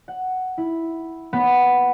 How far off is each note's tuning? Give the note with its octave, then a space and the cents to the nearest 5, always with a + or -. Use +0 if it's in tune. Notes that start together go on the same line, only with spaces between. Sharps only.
F#5 +5
E4 -5
B3 +0